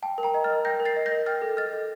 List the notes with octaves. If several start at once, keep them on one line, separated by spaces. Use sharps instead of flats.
G5 A5
A#4
G5 A#5
D#5
F6 A6
A#4
G5 G6 A#6
A#4
A6 C7
D#5
G6 A#6
A#4
G5 F6 A6
A4
D#5 F6 A6
A4